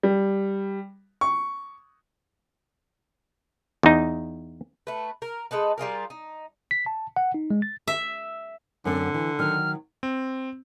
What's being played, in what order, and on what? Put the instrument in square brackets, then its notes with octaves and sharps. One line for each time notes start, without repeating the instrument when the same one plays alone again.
[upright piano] G3
C#6
[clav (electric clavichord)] E2 D#4
[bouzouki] A3 B4
A#4
G#3 D#4 A4 B4
G3 F4 G#4 A#4
D#4
[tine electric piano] B6
A5
F#5
D#4
G#3
A6
[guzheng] E5
[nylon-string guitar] F#2 C4 [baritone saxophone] D3
[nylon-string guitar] E3
[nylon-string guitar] D#3 F#3 [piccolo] F6
[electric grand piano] C4